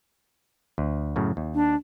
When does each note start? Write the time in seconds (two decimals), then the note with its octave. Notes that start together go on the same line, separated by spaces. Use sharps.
0.78 D2
1.16 F#2 A2 C#3
1.37 D#2
1.55 D4